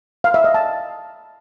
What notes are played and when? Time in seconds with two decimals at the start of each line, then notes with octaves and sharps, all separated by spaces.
0.24 F5
0.34 E5
0.44 D#5
0.54 A5